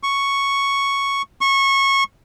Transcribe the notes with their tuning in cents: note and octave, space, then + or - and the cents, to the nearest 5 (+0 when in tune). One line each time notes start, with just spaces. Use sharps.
C#6 +0
C#6 -20